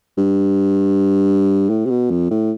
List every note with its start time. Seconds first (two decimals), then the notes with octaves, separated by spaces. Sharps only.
0.17 G2
1.70 A2
1.85 C3
1.90 B2
2.10 F2
2.30 A2